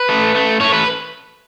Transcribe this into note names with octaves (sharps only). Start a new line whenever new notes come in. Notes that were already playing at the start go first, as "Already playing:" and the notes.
Already playing: B4
A3
A3
A3 C#5
B4